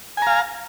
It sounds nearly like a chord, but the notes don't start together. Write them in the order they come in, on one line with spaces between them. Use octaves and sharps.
G#5 A#5 F5